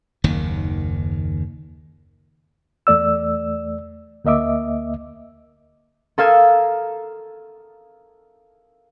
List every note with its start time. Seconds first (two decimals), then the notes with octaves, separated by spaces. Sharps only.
0.24 F#1 D#2 D#3
2.87 E2 A3 D5 E6
4.24 D2 A#3 D#5 E5 D6
6.18 A4 A#4 F5 D#6 E6 G#6